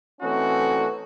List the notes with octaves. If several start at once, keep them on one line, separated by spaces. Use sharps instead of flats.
E3 A3 C4 C#4 D#4 F#4